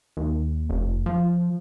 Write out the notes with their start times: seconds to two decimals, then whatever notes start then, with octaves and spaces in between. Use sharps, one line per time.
0.17 D#2
0.69 F1
1.06 F3